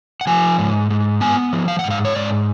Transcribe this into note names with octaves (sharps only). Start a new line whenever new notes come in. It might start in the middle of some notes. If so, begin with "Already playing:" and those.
F#5
F3 G#5
G#2
G#2
B3 G#5
F3
F5
G#2 F#5
F5
C#5
G#2 D5